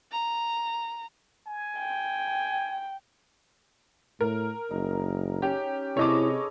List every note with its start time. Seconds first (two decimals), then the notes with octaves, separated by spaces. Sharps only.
0.11 A#5
1.47 G#5
1.79 G5
4.21 A2 A#4
4.71 F#1 D#4
5.42 C#4 G4
5.97 C3 E4 G#4 A4 B4 C#5 D#5 D6